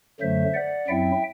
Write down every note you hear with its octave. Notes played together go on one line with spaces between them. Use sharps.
F#2 D3 F#3 A3 C5 E5
D5 F#5
F#2 F#3 C4 E4 E5 G5